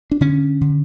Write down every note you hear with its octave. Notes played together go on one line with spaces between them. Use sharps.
D4
D3 C#4
D3